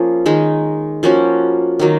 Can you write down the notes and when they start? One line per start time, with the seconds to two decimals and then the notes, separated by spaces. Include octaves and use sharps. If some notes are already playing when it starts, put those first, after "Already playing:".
Already playing: F3 A#3 C#4 G#4
0.26 D#3 G#3 D#4
1.03 F3 A#3 C#4 F#4
1.79 D#3 F#3 A#3